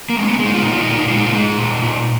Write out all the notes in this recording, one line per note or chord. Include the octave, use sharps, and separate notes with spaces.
A#3
G#3
C#4
B3
G#3
D#4
F4
A#2 D#4
F4
D#4
A#2 F4
D#4
G#3 F4
D#4
F4
G#3 D#4
A#2
A#2